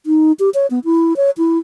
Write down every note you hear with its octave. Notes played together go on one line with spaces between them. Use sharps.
D#4
G4
C#5
B3
E4
C#5
E4